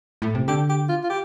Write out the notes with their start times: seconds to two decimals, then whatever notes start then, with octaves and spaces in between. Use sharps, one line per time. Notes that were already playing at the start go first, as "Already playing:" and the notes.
0.22 A2
0.35 C3
0.48 D3 G4
0.69 G4
0.89 F4
1.04 F4
1.10 G4